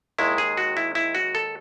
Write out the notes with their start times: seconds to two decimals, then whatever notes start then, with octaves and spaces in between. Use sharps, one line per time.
0.19 D#2 D#3 G#3 E4
0.38 G#4
0.57 F#4
0.77 E4
0.95 E4
1.15 F#4
1.35 A4